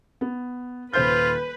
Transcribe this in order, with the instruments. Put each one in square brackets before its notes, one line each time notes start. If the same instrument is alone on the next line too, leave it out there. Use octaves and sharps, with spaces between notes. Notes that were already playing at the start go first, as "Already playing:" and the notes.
[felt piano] B3
[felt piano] D#1 C5 G6 [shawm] F4 [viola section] B4